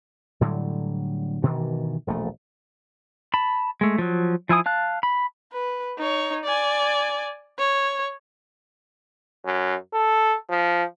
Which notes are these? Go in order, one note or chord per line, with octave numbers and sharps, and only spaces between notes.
A2 D3 F#3 G3
G2 B2 D#3 E3
E1 A#1 C3 A3
A5 B5
G#3 A3
F3 F#3
F3 E4 G#5 D#6
F5 A5 F#6
B5
B4
D#4 C#5
D5 G#5
C#5
F#2
A4
F3